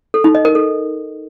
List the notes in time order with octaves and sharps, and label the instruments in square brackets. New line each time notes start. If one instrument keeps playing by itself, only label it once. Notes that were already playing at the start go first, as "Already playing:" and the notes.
[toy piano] A4
D#4
D#5
A#4
A4